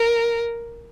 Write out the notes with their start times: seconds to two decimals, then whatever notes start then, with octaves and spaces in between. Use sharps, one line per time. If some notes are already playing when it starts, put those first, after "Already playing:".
Already playing: A#4